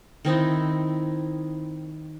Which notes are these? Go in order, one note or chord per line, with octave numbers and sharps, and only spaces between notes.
D#3 C4 D#4 E4